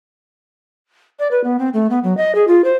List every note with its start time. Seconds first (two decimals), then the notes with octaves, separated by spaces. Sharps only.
1.19 D5
1.31 B4
1.44 B3
1.59 C4
1.73 A3
1.90 B3
2.03 F#3
2.17 D#5
2.35 G#4
2.47 F4
2.64 C5